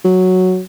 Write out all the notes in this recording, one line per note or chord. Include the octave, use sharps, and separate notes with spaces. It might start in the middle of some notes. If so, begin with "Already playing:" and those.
F#3